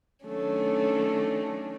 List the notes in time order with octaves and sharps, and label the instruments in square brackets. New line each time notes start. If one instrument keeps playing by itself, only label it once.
[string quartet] D#3 F#3 A3 C#4 D4